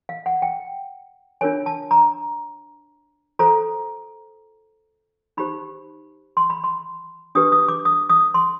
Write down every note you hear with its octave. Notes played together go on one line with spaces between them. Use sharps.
F5
F#5
G5
D4 F4 A#4 C#5 G#5
A5
A#5
F4 A4 C5 A#5
D#4 G4 C5 B5
C6
B5
C6
D4 G4 B4 D#6
D#6
D6
D#6
D#6
C6